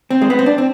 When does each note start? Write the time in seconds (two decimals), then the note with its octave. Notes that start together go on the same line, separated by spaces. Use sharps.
0.10 C4
0.22 G#3
0.30 B3
0.39 C4
0.46 D4
0.58 C4